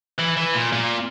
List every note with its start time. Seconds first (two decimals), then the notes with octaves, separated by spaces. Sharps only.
0.19 E3
0.37 E3
0.55 A#2
0.72 A#2